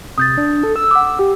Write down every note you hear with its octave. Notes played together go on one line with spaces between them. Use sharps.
C3 D#6 G6 A6
D4
A4
E6
F#5 D6
G4